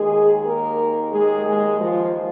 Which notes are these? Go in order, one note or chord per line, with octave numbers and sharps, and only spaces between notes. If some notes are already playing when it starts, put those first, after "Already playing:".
Already playing: D#2 D#3 G#3 G#4
A#3 A#4
G#3 G#4
G#3 G#4
F3 F4